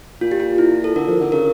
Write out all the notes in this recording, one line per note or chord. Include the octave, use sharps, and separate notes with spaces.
A#2 F4
G4
F4
E4
A4
D3 A#4
F3
D3
C#3 A#4